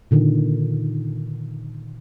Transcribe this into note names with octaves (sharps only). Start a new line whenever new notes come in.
A#2 D3 D#3